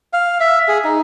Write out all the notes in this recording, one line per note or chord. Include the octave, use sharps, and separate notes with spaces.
F5
E5
G#4
D#4